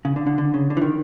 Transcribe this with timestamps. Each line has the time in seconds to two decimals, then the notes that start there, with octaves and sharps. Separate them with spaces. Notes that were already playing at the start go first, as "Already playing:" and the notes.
0.05 C#3
0.16 D3
0.27 D3
0.38 D3
0.54 C#3
0.70 D3
0.77 E3
0.82 D#3